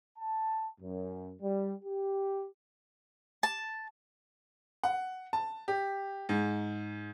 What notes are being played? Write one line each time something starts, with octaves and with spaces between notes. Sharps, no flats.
A5
F#2
G3
G4
A5
F#5
A5
G4
G#2